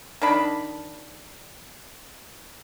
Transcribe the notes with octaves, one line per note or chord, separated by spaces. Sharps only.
D#3 D4 B5